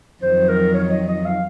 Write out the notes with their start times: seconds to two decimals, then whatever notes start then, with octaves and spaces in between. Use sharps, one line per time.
0.22 F2 D#3 F#3 C5
0.48 A#4
0.74 C#5
0.91 D#5
1.08 D#5
1.25 F5